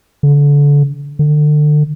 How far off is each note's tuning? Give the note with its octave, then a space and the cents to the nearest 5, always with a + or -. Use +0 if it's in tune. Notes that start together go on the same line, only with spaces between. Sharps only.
D3 -30
D3 +30